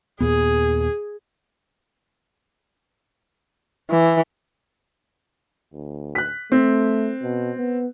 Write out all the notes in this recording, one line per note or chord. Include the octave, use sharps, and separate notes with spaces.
D#2 A#2 B3 G#4
E3
D2
F#6 B6
A3 C4
B2
B3